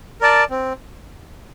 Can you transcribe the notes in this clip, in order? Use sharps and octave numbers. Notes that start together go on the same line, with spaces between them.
A#4 D5 A5
C4